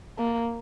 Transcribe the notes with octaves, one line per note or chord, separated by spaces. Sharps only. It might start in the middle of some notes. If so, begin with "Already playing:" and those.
A#3